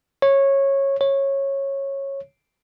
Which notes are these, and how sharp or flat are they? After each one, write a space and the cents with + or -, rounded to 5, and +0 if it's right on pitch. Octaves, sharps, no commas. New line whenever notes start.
C#5 -15
C#5 -15